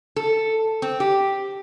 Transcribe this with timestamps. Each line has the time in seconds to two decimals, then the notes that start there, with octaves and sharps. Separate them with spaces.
0.16 A4
0.82 C4
1.00 G4